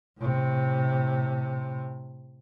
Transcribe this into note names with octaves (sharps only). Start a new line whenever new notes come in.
A2 C3